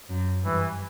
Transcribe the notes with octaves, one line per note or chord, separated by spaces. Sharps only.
F#2
G2 E3